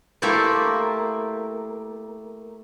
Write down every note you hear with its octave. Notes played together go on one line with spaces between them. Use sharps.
A3 A#3 E4 G4 C5 D5